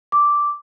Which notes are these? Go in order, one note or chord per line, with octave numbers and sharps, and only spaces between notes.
D6